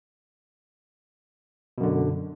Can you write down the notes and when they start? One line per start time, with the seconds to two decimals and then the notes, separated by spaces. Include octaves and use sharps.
1.78 B2
1.80 F#2
1.83 D3